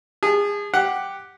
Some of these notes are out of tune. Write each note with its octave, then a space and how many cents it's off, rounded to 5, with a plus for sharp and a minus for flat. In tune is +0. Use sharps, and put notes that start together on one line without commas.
G#4 -30 A5 -45
G4 +0 F#5 +5